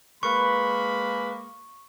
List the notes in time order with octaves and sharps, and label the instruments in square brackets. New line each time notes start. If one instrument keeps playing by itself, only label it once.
[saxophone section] G#3 A#3 [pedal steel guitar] B4 [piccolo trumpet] B5 [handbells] C#6